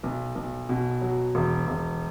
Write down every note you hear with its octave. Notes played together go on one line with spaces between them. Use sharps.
B1
B1
B2
F#3
E1
E1